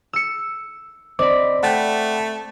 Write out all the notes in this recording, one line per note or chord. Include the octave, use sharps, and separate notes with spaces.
E6 C#7
C4 C5 D5 D#5 B5 D6
A3 F#5 G5 B5